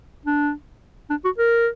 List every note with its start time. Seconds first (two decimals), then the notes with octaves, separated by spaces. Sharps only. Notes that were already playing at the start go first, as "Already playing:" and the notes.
0.25 D4
1.10 D4
1.25 F#4
1.38 A#4